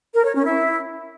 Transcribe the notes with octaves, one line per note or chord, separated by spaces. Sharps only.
A#4
C#5
C#4
E4